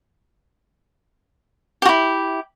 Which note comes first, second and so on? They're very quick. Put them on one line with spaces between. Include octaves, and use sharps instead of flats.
G4 F#4 E4